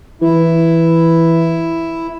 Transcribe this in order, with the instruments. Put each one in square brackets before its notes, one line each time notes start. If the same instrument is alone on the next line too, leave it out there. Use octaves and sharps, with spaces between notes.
[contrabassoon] E3 [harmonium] E4